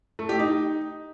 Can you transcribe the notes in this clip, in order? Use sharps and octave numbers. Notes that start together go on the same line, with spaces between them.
A3
G4
D#4